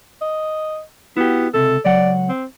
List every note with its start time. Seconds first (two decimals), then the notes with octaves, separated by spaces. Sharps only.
0.21 D#5
1.17 B3 E4 F#4 G4
1.54 C#2 C3 A4
1.85 C#2 F#3 D5 F#5
2.29 C4